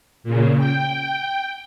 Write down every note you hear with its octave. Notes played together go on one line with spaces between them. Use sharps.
A#2 C#3
G5